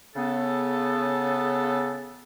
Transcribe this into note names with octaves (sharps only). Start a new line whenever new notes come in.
C#3 B3 A4